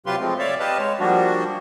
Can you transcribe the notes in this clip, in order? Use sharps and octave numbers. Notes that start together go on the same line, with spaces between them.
C3 F#3 F4 G4 B4 C6
F3 G#3 A3 C4
C#5 D5 E5 F5
G4 B4 D#5 F5 A5
G#3 C#5
F3 G3 A#3 D4 F#4